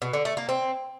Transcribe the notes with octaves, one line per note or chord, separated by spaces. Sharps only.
B2
D3
A3
A#3
C4